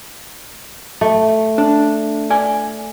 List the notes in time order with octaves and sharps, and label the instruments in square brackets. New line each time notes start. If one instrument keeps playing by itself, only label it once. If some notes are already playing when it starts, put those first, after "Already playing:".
[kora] A3
[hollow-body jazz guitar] D4
D5 G#5